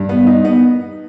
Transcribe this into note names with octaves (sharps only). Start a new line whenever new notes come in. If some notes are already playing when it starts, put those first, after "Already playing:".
Already playing: G2
B3
D#4
B3